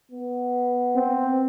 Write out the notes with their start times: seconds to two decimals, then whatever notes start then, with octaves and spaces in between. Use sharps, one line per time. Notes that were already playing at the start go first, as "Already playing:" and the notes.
0.12 B3
0.96 C4